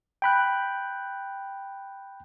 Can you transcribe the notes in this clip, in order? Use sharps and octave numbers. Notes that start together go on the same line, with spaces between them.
G5 B5 F#6